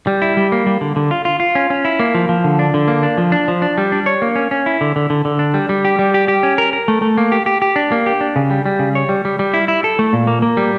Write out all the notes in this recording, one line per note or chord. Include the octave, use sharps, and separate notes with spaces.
G3
E4
G3
A#3
G3
D3
D3
F4
F4
F4
C#4
C#4
E4
A#3
F3
F3
D3
D4
D3
A#3
D4
F3
D4
F3
D4
G3
D4
C#5
A#3
C#4
C#4
E4
D3
D3
D3
D3
D4
G3
G3
G4
G3
G4
G4
C#4
A#4
A#4
A3
A3
A#3
G4
G4
G4
D4
A#3
G4
D4
C#3
G3
G3
C#3
C#5
G3
G3
G3
E4
E4
A4
A3
A#2
A#3
A#3
G3